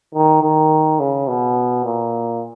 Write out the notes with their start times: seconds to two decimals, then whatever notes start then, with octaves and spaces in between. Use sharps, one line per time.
0.14 D#3
0.42 D#3
0.99 C#3
1.28 B2
1.84 A#2